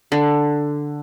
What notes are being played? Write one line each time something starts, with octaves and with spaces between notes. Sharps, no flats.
D3